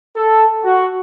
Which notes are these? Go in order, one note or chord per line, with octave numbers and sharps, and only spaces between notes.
A4
F#4